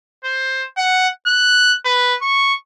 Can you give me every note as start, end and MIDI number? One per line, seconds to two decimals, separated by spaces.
0.24 0.65 72
0.77 1.08 78
1.27 1.73 90
1.85 2.14 71
2.22 2.53 85